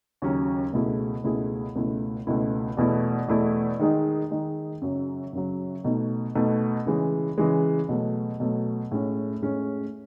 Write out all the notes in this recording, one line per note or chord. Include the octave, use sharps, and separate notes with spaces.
D#2 C#3 F#3 C#4
C#2 B2 A3 E4 G#4
C#2 B2 A3 E4 G#4
C#2 B2 A3 E4
C#2 B2 A3 E4
E2 B2 A3 E4
E2 B2 A3 E4
D#3 G#3 D#4
D#3 G#3 D#4
F#2 C#3 F#3
F#2 C#3 F#3
B2 A3 D#4
B2 A3 D#4
C#3 E3 G#3
C#3 E3 G#3
B2 F#3 A3
B2 F#3 A3
A2 G#3 C#4
A2 G#3 C#4